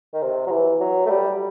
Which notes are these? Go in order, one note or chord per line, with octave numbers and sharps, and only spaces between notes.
D#3
C3
F#3
E3
F#3
A3
G3